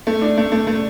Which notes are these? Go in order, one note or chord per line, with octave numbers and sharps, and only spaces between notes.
A3
D4
A3
A3
A3